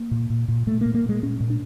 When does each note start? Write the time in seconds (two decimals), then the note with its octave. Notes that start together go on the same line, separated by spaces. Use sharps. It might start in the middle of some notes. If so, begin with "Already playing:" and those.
Already playing: A#3
0.11 A#2
0.30 A#2
0.48 A#2
0.67 A#2 A3
0.81 A#3
0.86 A#2
0.94 A#3
1.04 A#2 G#3
1.23 A#2 C#4
1.41 A#2
1.50 D4